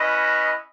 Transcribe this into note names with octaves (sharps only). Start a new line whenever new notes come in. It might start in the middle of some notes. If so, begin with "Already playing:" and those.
Already playing: C#4 E4 B4 D#5